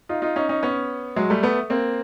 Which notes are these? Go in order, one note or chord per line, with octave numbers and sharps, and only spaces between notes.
D#4 F4
D#4 F4
C#4 D#4
C#4 D#4
B3 C#4
F#3 G#3
G3 A3
A3 B3
A#3 C4